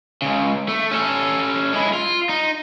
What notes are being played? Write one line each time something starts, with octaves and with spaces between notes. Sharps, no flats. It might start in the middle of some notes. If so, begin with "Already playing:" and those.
C#2 C#3
A3
C#4 A4
G#3 E4
F4
D#4